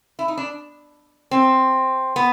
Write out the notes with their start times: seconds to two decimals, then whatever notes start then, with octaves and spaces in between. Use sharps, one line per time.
0.19 E4
0.28 D#4
0.37 D4
1.31 C4
2.16 B3